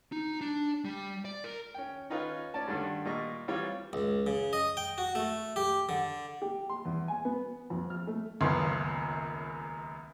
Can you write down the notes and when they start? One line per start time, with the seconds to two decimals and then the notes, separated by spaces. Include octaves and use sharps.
0.12 D#4
0.41 D4
0.85 G3
1.25 D5
1.44 A#4
1.74 C#4 G5
2.10 C#4 D#4 F4 B4 C#5
2.54 C#4 D5 A5
2.68 G2 D3 D#3 G3
3.05 A#2 G3 D#5 C#6
3.48 E3 G3 C4 F4 B4 C#5
3.93 C#2
4.27 C#3
4.53 D#5
4.77 G5
4.98 F#4
5.15 A3
5.56 G4
5.89 D3
6.42 G4
6.69 C6
6.85 E2
7.08 G#5
7.25 B3
7.70 F2
7.90 F6
8.07 A3
8.40 D#1 C#2 F#2 B3 C6